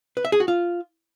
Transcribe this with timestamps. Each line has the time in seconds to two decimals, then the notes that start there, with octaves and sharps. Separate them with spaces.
0.17 B4
0.25 E5
0.32 G#4
0.40 F#4
0.48 F4